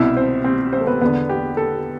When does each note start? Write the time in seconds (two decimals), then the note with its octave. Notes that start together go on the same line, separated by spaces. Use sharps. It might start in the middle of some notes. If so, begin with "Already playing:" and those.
Already playing: C2 B2 E4 E5
0.17 C4 C5
0.44 C4 C5
0.73 C4 C5
0.81 A4
0.87 B3 B4
1.01 E2 D3 B3 B4
1.29 G4
1.57 A4